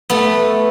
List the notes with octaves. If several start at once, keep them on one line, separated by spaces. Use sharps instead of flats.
A3 B3